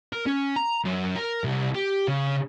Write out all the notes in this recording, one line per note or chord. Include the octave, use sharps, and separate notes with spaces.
A#4
C#4
A#5
F#2
A#4
C2
G4
C#3